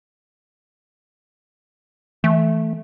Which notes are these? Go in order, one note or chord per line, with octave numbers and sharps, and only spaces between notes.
E3 A3